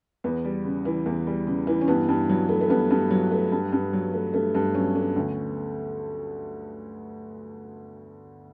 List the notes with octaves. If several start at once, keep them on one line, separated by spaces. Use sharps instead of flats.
E2 B3
G3
C#3
E3
E2
G3
C#3
E3
C#4
G2 B3
G2
F#3
A3
A3
G2 B3
G2
F#3
A3
G2
G2
F#3
A3
G2 A3
G2
F#3 C#4
A3 D4
D2 C#4